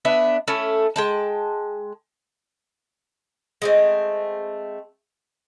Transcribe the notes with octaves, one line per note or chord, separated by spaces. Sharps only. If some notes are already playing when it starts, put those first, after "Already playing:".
B3 D4 E5
A3 C#4 E4 A4
G#3 G5 A5
G#3 A3 C4